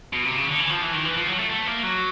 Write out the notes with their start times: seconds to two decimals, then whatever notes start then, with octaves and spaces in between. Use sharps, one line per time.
0.13 B2
0.25 C3
0.36 C#3
0.47 D3
0.59 E3
0.70 F3
0.82 E3
0.93 D#3
1.05 E3
1.16 F3
1.28 F#3
1.39 A3
1.50 A3
1.67 A#3
1.84 F#3